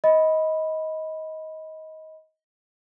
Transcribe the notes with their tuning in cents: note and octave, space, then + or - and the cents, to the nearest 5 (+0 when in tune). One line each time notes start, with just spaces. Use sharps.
D#5 +20 B5 +0